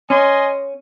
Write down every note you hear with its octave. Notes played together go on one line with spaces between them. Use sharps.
C#4 D#5 G#5 C6